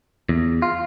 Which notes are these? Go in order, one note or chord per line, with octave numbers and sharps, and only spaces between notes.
E2
F4